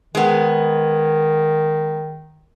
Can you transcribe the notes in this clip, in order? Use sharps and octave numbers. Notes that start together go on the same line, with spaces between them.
D#3 G#3 B3